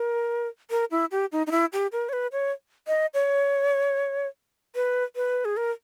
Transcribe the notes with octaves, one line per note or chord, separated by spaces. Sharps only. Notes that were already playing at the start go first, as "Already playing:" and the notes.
Already playing: A#4
A#4
E4
G4
D#4
D#4
E4
G4
A#4
C#5
B4
C#5
D#5
C#5
B4
B4
G#4
A#4